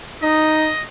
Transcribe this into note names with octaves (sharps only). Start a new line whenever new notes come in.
D#4 D#5